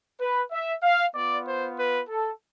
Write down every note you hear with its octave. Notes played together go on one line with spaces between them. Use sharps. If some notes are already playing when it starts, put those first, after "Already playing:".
B4
E5
F5
B3 F4 D5
C5
B4
A4